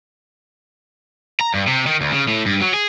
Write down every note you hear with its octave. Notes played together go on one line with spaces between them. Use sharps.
A#5
G2
C3
D#3
D2
C#3
A2
G2
F#3
G#4